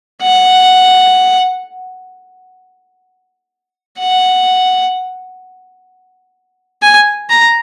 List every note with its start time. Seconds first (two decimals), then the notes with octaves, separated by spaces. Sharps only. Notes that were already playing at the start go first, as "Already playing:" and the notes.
0.23 F#5
3.99 F#5
6.82 G#5
7.30 A#5